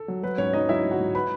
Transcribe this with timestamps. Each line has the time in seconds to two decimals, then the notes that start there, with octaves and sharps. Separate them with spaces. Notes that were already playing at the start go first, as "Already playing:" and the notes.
Already playing: A4
0.08 F#3
0.23 F#3 B4
0.38 G#2 C#4 C#5
0.53 F#3 D#4 D#5
0.69 F#3 E4 E5
0.85 G#2
0.91 F#4 F#5
1.00 G#2
1.15 B4 B5